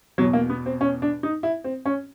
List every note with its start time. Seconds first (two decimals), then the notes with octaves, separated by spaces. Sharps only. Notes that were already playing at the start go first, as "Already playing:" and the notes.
0.18 E2 B2 F#3
0.33 A#3
0.50 B3
0.66 C4
0.81 C#4
1.02 D4
1.23 D#4
1.43 E4
1.64 C4
1.86 C#4